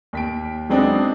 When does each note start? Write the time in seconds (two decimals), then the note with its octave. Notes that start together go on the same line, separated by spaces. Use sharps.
0.13 D#2 B6 D7
0.69 F#3 G#3 B3 C4 D4 D#4